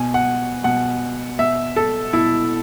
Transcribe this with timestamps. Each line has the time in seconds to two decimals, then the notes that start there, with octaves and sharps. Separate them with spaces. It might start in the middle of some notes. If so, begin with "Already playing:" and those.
Already playing: B2 G#5
0.14 F#5
0.64 B2 F#5
1.39 B2 E5
1.76 A4
2.13 B2 E4